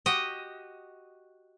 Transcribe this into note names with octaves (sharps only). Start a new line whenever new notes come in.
F#4 G4 D#5